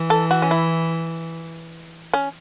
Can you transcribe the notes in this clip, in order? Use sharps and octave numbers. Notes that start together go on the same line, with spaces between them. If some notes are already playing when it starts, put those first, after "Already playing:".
Already playing: E3
A4
F#4
C#4
E4
C#4